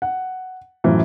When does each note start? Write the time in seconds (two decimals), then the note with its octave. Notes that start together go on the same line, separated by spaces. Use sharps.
0.02 F#5
0.84 F#2 A2 E3 F3